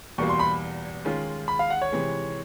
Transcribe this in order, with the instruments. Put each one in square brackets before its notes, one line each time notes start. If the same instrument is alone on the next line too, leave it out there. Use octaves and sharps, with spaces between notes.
[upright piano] E2 B2 G3 A#3 [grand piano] C#6
[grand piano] C6
B5
[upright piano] D#3 G#3 C#4 F4
[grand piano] B5
F5
F#5
C#5
[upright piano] C3 E3 G#3